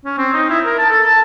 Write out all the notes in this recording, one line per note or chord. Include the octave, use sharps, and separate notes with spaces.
C#4
C4
D#4
E4
A#4
A5
A4
A5